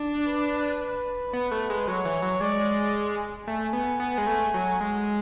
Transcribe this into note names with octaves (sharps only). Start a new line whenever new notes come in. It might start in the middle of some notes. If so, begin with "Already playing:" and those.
Already playing: D4
B4
B3
A3
G#3
F#3 C#5
E3
F#3
G#3 D5
A3 G#5
B3
B3 G#5
G#3
A3
F#3
G#3